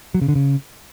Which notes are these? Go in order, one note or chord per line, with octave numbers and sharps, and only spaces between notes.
F#3
C#3
D3
C#3